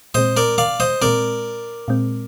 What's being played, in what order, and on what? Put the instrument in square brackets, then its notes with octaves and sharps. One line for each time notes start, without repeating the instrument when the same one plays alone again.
[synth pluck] A#2 G#3 C4 [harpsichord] C5 D#5
[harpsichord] A#4 D5
D5 F5
C5 D#5
[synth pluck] A#2 G#3 C4 [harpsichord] A#4 D5
[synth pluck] A#2 G#3 C4